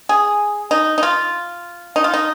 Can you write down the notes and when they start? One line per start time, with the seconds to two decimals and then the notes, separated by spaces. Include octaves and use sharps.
0.09 G#4
0.71 D#4
0.98 D#4
1.03 F4
1.96 D#4
2.04 F4
2.14 D#4